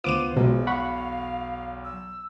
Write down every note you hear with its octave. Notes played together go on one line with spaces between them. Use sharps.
D2 B3 F4 C5 D6 D7 D#7
B1 E2 B2 F3 G#3
F5 F#5 B5 C#6
E6